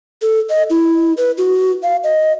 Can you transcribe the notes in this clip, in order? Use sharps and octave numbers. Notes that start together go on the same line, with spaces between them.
A4
D#5
E4
B4
F#4
F5
D#5